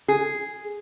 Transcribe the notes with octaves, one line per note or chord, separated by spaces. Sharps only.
G#4